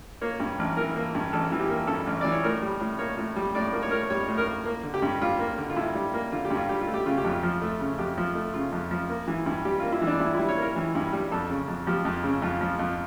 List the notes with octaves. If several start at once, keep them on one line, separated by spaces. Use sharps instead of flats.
A#3 C#5
G2
A1
E3 A#4
A#3
G2
A1 A4
E3
G4
A#3
G2 A4
A1
E3 D5
C#5
A2 A#4
G3
A2
A#3 C#5
A2
G3
A2 D5
A#3
C#5
A2 A#4
C#5
G3 C#5
A2
A#4
A#3
A#3
D3
G4
G2
G3 F4
A#3
D3
F4
G2 E4
G3
A#3
D3 F4
G4
G2
F4
G3 G4
F4
A3
G4
C#3 F4
G4
F2
F4
F3
A3
C#3
F2 G4
F3
A3
C#3 F4
F2
F3
A#3
E3
G2
G3 G4
A#3 F4
E4
E3
D4
G2 E4
G3 E4
C#5
A#3 A#4
E3
G2
G3
F2 A4
C#3
F2
F3 G4
F2
C#3
F2 F4
F3
F2